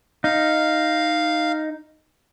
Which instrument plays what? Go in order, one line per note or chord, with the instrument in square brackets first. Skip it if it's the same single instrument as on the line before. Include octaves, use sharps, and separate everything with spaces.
[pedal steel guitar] D#4 [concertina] F5